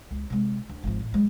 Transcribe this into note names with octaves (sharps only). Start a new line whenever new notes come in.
C#2
C3 G#3
D2
G#1 F3
A1
F#3 G#3